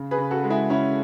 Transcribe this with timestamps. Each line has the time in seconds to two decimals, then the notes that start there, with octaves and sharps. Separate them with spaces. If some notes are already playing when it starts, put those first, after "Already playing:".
Already playing: C#3
0.11 G#4 B4
0.18 C#3
0.31 F#4 A4
0.44 G#3
0.50 E4 G#4
0.70 C#3 C#4 E4